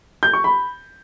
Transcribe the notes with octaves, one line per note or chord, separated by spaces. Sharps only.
G6
C#6
B5